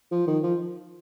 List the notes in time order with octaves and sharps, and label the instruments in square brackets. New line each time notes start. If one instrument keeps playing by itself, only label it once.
[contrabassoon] F3
D#3
F3